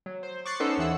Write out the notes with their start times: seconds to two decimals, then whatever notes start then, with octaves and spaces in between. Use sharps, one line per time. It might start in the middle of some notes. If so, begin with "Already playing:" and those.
0.06 F#3
0.23 C5
0.46 C#6 D6 F#6 A6 C7 C#7
0.60 B3 C#4 D#4 A4 C5
0.77 D#2 E3 F#5 E6